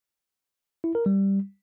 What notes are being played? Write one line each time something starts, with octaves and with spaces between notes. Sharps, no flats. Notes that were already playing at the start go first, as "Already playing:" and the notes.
E4
A#4
G3